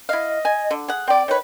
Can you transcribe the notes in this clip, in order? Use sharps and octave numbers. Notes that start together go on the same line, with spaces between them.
E4 D#5 F5
G#5
D3
G#4 F#5
C4 D5 G5
D#3 B4 C#5